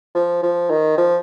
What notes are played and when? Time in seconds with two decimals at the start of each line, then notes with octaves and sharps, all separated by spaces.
0.15 F3
0.42 F3
0.70 D#3
0.98 F3